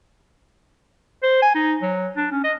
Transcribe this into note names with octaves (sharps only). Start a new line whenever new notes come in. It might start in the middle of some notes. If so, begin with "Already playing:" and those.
C5
G#5
D#4
F#3
D4
C#4
D#5